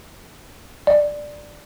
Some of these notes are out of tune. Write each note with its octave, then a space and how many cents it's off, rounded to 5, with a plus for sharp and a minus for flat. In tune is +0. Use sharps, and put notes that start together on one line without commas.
D5 +5